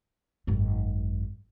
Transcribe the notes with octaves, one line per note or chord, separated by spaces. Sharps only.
G#1 F#2